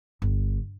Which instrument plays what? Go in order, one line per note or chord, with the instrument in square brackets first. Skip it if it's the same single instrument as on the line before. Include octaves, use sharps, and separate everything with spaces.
[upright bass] G1